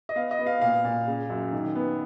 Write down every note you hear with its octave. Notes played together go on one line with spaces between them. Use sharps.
D#5
B3 F5
D#5
B3
F5
A#2 F5
A#2
C#3
F#2
D#3
B3